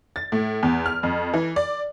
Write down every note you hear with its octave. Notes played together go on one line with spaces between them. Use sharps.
A6
A2
E2
F6
F2
E3
D5